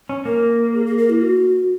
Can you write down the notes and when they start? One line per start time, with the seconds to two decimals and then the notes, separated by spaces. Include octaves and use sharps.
0.09 C#4
0.25 A#3 A#4
0.74 G#4
0.86 G#4
0.98 A#4
1.10 E4
1.22 F#4